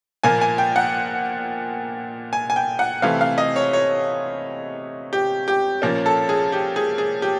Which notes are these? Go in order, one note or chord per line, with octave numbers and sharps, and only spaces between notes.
A#2 F3 A#3 G#5
G#5
G5
F#5
G#5
G#5
G5
F#5
C3 E3 A3 C4 F5
F5
D#5
C#5
C#5
G4
G4
A#2 F3 A#3 C#4
A4
G#4
G4
G#4
G#4
G4